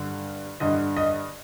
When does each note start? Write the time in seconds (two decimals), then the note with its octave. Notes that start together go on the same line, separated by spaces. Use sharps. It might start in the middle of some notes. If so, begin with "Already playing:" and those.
Already playing: G2 D3
0.60 G2 D3 D#5
0.97 D#5